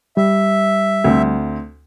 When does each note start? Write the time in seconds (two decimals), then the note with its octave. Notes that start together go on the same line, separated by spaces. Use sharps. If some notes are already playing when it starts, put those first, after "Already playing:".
0.17 G3 E5
1.04 D2 C4